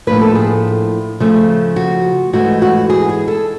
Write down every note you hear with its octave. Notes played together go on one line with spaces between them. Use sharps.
A2 F3 A#3 D4 B4
A4
G#4
C#3 F3 A3
F#4
G#2 E3 A3 F#4
F#4
G#4
G#4
A4